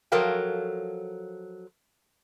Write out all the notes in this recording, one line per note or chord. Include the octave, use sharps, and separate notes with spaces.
F3 F#3 A4 A#4 F5 G5